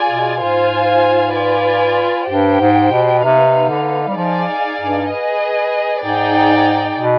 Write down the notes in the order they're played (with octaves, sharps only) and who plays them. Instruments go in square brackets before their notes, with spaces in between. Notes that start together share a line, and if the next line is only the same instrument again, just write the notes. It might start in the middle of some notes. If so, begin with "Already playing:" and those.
Already playing: [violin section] F4 G#4 D5 G#5
[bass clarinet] B2
[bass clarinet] G#2 [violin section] F4 C5 F5 G#5
[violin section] F4 B4 D5 G#5
[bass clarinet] G2 [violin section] G4 C5 G5
[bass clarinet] G#2
B2
[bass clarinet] C3 [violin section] B3 D#4 B4 F5
[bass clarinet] D3
G3
[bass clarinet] F3 [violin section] D#4 G#4 D5 F5 G#5
[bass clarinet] G2
[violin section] G#4 B4 D#5
[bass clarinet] G#2 [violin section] D#4 G#4 D5 G5
[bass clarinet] B2